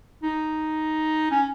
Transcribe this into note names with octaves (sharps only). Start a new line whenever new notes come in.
D#4
C#4